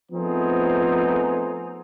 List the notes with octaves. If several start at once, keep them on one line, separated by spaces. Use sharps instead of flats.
F3 A3 B3 C4 D#4 G#4